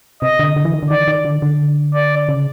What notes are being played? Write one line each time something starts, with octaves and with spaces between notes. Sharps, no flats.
C3 D#5
D3
D3
E3
D#3
D3
D#3 D5
D#3
D3
D3
D5
C#3